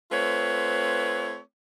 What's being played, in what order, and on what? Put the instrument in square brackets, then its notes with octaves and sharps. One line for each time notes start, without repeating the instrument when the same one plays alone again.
[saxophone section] A3 C4 F4 B4 C#5